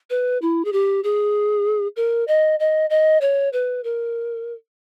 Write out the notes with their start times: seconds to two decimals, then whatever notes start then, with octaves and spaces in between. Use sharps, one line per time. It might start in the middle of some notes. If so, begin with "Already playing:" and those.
0.10 B4
0.42 E4
0.65 G#4
0.73 G4
1.04 G#4
1.96 A#4
2.28 D#5
2.60 D#5
2.90 D#5
3.21 C#5
3.53 B4
3.84 A#4